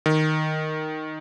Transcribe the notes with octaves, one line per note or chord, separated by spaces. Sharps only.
D#3